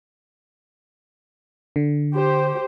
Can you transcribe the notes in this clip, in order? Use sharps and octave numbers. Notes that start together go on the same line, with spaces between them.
D3
G4 C5